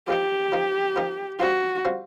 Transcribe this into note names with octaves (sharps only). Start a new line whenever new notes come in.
F3 A#3 D#4 G4
F3 A#3 D#4
F3 A#3 D#4
G3 C4 F4 F#4
G3 C4 F4